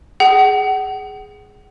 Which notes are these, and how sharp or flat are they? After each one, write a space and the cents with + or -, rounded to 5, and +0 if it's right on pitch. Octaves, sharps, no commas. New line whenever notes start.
G#4 +0 F#5 +35